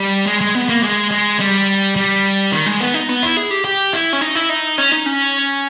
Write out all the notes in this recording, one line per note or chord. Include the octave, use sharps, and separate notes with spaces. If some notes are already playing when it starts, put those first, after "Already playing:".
Already playing: G3
G#3
G#3
B3
A#3
G#3
G#3
G3
G3
D#3
G#3
B3
D#4
B3
E4
G#4
G4
G4
E4
C#4
D#4
E4
D#4
C#4
D#4
C#4